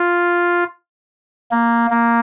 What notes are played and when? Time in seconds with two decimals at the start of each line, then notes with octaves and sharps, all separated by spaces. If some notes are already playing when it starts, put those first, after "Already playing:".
Already playing: F4
1.51 A#3
1.90 A#3